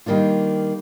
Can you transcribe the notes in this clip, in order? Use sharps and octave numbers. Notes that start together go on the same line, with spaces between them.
D#3 G3 A#3 D4 F4